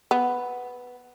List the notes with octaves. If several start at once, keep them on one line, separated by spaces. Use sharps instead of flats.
B3